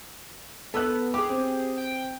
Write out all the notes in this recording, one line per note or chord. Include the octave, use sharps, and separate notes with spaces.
B3 A4 E6 F#6
G4 G#4 D6
C4
G5